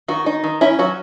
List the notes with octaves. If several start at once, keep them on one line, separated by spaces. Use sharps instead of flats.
D#3 F#4
D#4
D#3
C#4 E4
F#3 F#4